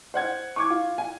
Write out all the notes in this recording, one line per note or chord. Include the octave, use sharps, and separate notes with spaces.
C5 F#5 G#6
C#6 D6 G#6
F4
G#5